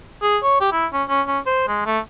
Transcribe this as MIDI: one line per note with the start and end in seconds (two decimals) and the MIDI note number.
0.22 0.38 68
0.43 0.61 73
0.61 0.68 67
0.72 0.86 64
0.93 1.03 61
1.09 1.22 61
1.27 1.39 61
1.46 1.67 72
1.68 1.84 56
1.86 1.99 57